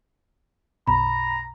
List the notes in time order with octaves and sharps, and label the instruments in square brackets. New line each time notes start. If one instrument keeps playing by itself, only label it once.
[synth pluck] B1 F#2 B2 [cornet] A#5 [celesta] B5